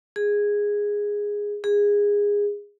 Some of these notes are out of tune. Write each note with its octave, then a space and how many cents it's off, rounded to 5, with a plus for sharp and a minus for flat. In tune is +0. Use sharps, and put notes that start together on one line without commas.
G#4 -10
G#4 -20